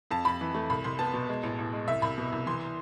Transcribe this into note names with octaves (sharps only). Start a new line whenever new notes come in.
F2 A5
F2 B5
E3
A3
C2 B5
C2 C6
B3 A5
B2
G#3
A1
A1
G#3
C2 E5
C2 B5
B2
C2
E3 C6